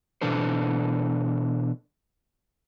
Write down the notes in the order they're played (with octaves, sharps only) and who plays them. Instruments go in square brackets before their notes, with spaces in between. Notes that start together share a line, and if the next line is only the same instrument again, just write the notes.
[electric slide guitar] B2 E3 D4 A4 C5